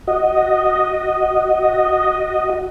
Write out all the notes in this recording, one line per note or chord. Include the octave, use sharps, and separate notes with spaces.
F#4 D#5